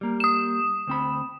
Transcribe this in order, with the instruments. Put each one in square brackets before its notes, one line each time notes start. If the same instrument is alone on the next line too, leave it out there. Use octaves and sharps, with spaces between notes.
[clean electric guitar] G3 A#3
[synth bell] D#6 E7
[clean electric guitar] D2 C4 B5